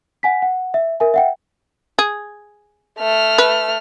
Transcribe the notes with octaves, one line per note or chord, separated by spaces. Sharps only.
F#5 G#5 B6
F#5
E5
A#4 E5 G#5
E5 F#5 G5
G#4
A3 F6
B4